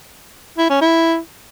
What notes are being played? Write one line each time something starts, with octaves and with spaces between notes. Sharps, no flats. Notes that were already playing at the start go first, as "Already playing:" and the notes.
E4
C#4
E4